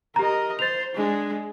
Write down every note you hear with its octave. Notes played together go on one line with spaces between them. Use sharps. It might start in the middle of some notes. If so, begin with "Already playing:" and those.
G4 A#4 D#5 A#5
C5 A6 F7
G#3 D4